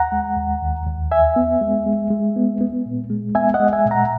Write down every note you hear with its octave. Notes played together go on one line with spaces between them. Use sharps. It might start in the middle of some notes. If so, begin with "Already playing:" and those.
Already playing: D#2 F#5 A#5
G#3
D#2
D#2
D#2
E2 E5 G#5
B3
G#3
G#3
G#3
B3
B3
A#2
G#3
B3 E5 G#5
D#5 F#5
G#3
E5 G#5
A#2
F#5 A#5